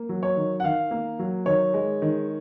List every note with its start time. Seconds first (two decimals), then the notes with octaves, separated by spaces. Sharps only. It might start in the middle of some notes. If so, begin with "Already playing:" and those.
Already playing: A#3
0.09 F#3
0.23 C#5
0.37 D#3
0.60 F#5
0.64 D#3 F5
0.91 A#3
1.19 F#3
1.46 D#3 C#5
1.74 G#3
2.02 D#3